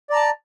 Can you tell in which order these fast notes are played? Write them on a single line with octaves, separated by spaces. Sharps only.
D5 A#5 A5